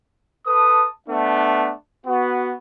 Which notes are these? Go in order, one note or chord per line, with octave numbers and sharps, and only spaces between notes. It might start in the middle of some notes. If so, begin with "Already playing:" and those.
A4 B4 A5 D#6
A3 B3 D4
B3 F#4